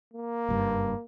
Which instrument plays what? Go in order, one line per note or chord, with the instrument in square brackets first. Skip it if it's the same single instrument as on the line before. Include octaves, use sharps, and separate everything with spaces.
[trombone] A#3
[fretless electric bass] F#1 G2